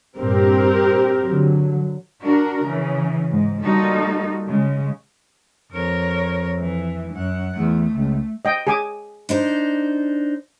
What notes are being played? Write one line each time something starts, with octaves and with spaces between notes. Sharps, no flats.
G2 A#2 C4 G4 A#4
D3 F#3
D4 F#4 A#4
C#3 E3
G#2
G3 A#3 D#4 F4 F#4 A4
C#3 G#3
F2 A#4 C#5
E3
F#2 F#5
E2 A3
C#2
D#5 G5
G#4 G#5 D6
D4 D#4 C5